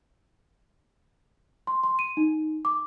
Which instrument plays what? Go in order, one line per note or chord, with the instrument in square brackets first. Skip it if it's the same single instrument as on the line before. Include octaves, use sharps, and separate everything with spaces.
[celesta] C6
C6
D#7
D#4
D6